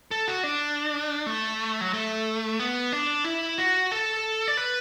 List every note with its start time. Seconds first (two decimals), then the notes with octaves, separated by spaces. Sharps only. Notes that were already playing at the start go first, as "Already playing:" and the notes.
0.11 A4
0.28 F#4
0.43 D4
1.26 A3
1.81 F#3
1.93 A3
2.60 B3
2.92 D4
3.24 E4
3.58 F#4
3.92 A4
4.48 D5
4.57 B4